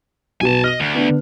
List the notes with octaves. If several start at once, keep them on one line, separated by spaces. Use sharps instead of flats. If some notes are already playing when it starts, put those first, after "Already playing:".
B1 F#4 B4 G#5 A5
D#5 F6
D2
B3 D4